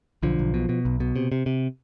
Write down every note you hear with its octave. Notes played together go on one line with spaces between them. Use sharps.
B1 D3 F3
B1
B2
B2
B1
B2
C3
C3
C3